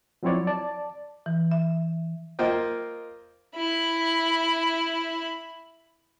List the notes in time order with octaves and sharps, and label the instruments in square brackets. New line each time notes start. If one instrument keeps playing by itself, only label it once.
[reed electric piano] F3 F#3 C4 E4 C#5 D5
D5 A5
[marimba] E3
E5
[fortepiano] A#3 F4 C5 D#5 G5
[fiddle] E4 B5